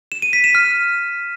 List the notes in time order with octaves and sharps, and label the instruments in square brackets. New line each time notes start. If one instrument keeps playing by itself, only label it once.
[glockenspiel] E7
D#7
B6
E7
F6